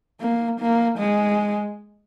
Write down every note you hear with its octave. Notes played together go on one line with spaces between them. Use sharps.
A#3
A#3
G#3